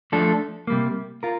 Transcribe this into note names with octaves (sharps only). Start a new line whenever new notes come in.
F3 A3 D4 A4
C3 G3 A#3
F4 A#4